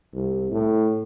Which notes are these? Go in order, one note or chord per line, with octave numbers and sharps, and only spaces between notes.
C2
A2